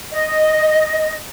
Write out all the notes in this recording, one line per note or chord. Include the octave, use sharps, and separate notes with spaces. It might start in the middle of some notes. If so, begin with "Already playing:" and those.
D#5